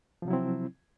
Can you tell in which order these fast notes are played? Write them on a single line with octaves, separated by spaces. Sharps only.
F3 C3 F#3 E4 C4